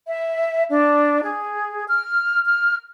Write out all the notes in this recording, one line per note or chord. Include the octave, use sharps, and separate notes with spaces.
E5
D4
G#4
F6
F6